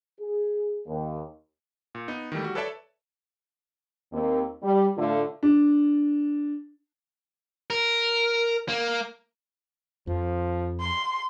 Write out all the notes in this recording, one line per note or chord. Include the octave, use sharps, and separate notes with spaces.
G#4
D#2
A#2
B3 D#4
D#3 E3 G3 A3
G3 F#4
A4 B4 C#5 D5 E5 A5
D#2 A#3 C4
G3
A2 D3 A3 F4
D4
A#4
A#3
F2 F3
C6